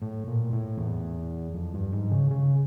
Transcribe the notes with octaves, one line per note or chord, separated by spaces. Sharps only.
A2
A#2
A2
E2
F2
G2
G#2
C#3
C#3